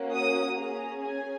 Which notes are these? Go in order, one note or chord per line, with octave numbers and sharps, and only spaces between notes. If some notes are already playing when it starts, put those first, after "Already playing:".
Already playing: A#3 C#4 F#4
D#6
C#4 G#4 A#5
G#5